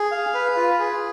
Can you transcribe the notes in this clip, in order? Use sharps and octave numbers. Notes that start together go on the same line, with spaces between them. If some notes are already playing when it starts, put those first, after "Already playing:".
Already playing: G#4
F5
B4
F4
G#4